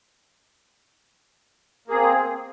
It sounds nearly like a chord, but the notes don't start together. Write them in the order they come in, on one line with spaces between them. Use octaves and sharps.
A#3 G#4 C4